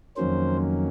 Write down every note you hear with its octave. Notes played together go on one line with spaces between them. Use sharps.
F2 D#3 F#3 A#3 C#4 C5